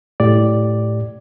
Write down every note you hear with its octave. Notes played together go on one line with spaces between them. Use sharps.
A2 G4 D5